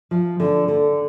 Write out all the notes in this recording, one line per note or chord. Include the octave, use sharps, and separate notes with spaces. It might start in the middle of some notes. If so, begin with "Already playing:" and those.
F3
D3
D3